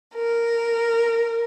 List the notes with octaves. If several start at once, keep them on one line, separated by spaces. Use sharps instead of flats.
A#4